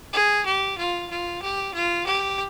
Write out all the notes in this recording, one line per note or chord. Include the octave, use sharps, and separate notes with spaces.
G#4
G4
F4
F4
G4
F4
G4